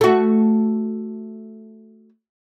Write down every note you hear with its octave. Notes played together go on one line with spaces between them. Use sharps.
A3 F#4